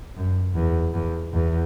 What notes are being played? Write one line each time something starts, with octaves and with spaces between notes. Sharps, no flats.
F#2
E2
E2
E2